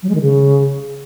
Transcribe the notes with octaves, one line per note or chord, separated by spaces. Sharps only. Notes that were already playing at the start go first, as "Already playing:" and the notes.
F#3
G#3
D#3
C#3